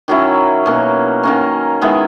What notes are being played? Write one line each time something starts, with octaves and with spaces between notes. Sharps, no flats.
D#3 F#3 C#4 E4
B2 A#3 C#4
D#3 A#3 C#4
D#3 G#3 B3 E4